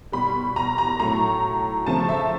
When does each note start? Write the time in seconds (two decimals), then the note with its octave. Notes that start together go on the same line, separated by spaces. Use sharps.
0.12 B2 G3 B5
0.56 A#5
0.78 A#5
0.99 A2 F#3 A3 A#5
1.86 C#3 F3 A3 A5
2.09 E5